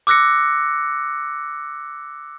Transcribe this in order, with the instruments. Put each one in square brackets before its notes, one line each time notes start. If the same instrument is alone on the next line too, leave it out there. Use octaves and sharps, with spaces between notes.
[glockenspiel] D6 E6 F#6 A#6 C#7